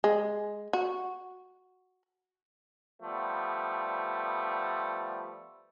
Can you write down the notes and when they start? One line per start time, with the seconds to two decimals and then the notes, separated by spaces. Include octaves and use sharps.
0.04 G#3
0.73 F#4
3.03 F3 G3 A3 B3